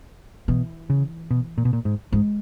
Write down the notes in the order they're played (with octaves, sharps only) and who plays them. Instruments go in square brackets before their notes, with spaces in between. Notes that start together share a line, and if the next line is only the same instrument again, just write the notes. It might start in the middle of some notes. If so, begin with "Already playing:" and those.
[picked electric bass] B2 [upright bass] E3
[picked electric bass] C#3
B2
A#2
B2
A#2
G#2
[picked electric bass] G#2 [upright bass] G#3